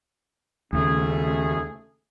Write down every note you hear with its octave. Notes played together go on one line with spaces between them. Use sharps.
D#2 C#3 A3 C#4 G#4